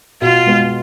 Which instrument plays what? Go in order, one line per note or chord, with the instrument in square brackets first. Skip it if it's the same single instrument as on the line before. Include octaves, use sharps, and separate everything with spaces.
[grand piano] B2 [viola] F4
[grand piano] G#3 B3